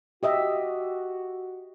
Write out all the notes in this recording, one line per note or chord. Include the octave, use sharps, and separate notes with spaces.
F#4 G4 D#5 E5